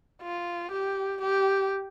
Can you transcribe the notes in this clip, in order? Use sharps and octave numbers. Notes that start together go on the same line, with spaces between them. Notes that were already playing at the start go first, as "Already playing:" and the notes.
F4
G4
G4